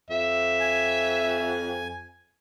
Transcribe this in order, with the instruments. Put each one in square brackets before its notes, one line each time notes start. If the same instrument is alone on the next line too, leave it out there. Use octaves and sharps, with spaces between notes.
[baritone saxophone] F2 [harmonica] E5
[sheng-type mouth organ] G#5